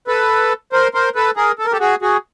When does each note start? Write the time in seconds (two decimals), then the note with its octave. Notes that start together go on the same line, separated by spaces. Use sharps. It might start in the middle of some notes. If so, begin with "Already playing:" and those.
0.07 A4 B4
0.72 A#4 C5
0.94 A#4 C5
1.15 A4 B4
1.36 G#4 A#4
1.59 A4
1.65 A#4
1.72 G4 A4
1.80 F#4 G#4
2.02 F#4 G#4